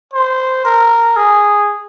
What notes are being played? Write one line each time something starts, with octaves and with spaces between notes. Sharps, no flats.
C5
A#4
G#4